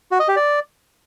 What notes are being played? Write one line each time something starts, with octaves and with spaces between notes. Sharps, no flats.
F#4
D#5
G4
D5